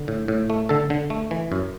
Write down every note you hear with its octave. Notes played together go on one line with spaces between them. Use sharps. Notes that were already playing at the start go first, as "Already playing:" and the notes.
Already playing: D3
A2
A2
A3
D3 A4
D3
A3
E3
F#2